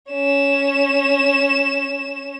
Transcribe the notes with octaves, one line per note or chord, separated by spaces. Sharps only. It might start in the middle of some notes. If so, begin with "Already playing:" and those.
C#4 E7